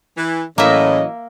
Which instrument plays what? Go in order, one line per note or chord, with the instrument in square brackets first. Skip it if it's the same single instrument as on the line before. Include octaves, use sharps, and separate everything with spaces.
[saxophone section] E3
[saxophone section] A2 [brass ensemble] E3 F#3 D#5 [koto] A#3 E5 [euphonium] C#4